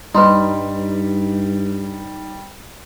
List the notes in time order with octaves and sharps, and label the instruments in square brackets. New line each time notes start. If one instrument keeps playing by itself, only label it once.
[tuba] G2 [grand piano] G3 [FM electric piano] D#4 [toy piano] B4 B5 C6